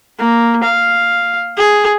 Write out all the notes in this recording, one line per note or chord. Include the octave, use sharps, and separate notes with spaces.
A#3
F5
G#4